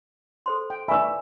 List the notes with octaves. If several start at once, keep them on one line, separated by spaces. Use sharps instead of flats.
A4 C5 C6
G5
B4 D5 E5 G#5 B5 C#6 E6